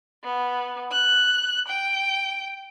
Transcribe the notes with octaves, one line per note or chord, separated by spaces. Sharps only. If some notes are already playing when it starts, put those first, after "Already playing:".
B3
F#6
G5